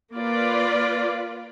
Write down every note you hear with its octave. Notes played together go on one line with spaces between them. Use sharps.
A#3 F4 B4 D5